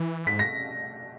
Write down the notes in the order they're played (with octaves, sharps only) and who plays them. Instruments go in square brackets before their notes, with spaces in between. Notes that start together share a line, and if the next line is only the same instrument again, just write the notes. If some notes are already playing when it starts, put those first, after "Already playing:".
Already playing: [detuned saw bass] E3
[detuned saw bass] G#2 [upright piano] B6
[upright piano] A#6